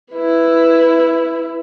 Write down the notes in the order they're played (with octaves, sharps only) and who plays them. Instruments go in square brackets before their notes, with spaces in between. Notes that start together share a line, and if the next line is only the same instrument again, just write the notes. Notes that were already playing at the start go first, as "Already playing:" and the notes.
[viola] E4 B4